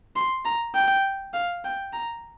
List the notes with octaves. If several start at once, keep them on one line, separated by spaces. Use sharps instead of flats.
C6
A#5
G5
F5
G5
A#5